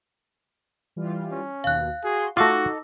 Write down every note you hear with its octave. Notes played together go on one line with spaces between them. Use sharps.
E3 G3 F4
C#4
D#2 B2 F5 F#6
F#4 G#4 C6
A3 D#4 F4 F#4 A4 D6 E6 A#6